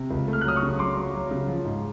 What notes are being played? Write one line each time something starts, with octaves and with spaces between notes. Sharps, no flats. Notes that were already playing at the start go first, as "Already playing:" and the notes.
Already playing: C3
C#2
A3
F6
F#6
F#3 D#6 F6
C#6 D#6
C#3
F#3 C6 D6
F#3
F#3
C#3
F3
G#2